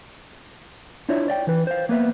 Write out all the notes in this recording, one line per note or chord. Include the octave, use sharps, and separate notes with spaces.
D4 E4 F4 C#5 D5 E5
C#5 D5 E5 G5
E3 B4
C5 F5
A#3 B3 B4 E5